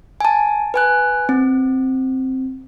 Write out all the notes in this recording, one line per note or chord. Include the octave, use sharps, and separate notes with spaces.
G#5 A5
B4 G#5 F#6
C4